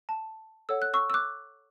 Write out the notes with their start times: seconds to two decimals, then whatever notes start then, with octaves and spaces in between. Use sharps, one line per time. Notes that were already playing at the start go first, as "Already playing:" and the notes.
0.09 A5
0.69 A4 C#5 F#5 E6
0.82 F#6
0.94 C#6 E6
1.10 E6
1.14 D6 F#6